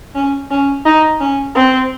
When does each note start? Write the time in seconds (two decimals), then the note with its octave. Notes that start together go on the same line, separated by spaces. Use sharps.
0.15 C#4
0.51 C#4
0.85 D#4
1.20 C#4
1.55 C4